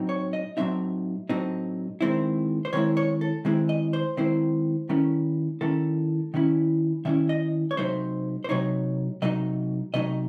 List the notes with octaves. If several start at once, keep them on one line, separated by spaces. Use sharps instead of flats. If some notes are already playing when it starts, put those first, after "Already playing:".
Already playing: A2 F#3 C4 D#4
C#5
D#5
A2 F#3 C4 D#4 E5
A2 F#3 C4 D#4
D#3 G#3 C4 E4
C5
D#3 G#3 C4 E4 C#5
C#5
A4
D#3 G#3 C4 E4 G#4
D#5
C5
D#3 G#3 C4 E4 C5
D#3 A3 C#4 E4
D#3 A3 C#4 E4 A4
D#3 A3 C#4 E4
D#3 A3 C#4 E4 E5
D#5
C#5
C3 F#3 A3 D#4 C5
C5
C3 F#3 A3 D#4 C#5
C3 F#3 A3 D#4 D#5
C3 F#3 A3 D#4 D#5